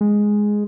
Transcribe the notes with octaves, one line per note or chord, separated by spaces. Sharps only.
G#3